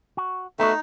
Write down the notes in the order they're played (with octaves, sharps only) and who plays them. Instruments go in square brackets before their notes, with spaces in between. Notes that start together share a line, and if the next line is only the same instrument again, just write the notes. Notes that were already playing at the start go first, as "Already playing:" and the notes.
[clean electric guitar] F#4
[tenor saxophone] A3 [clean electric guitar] B3 F#4 [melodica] D#4